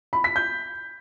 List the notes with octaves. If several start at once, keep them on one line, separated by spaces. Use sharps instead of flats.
B5
B6
G6